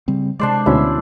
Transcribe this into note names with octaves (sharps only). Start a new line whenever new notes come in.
C#3 G3 C4
C3 G#3 D4 C5 D5
D2 B2 C#4 E4